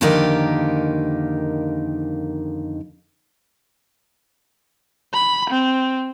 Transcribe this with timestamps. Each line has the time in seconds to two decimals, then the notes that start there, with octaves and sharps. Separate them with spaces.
0.01 F2 D3 D#3 A#3 D#4 G4
5.13 B5
5.50 C4